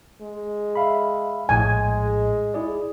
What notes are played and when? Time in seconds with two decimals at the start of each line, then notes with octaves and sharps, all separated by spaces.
0.22 G#3
0.75 E5 F5 B5
1.49 A#1 A2 G#3 G#5
2.54 E4 G#4 D5